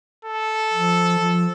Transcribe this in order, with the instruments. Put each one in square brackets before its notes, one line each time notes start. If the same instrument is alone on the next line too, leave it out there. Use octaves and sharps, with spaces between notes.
[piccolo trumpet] A4
[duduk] F3
F3